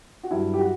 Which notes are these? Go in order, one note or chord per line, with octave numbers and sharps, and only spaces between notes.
F#4
G2 F#3 E4
G4
F#4